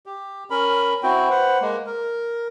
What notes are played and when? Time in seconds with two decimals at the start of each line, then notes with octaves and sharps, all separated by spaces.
0.06 G4
0.50 C#4 A#4 B5
1.03 C4 E4 F#4 G5
1.30 B4 C5 F#5
1.61 G#3 A#3
1.86 A#4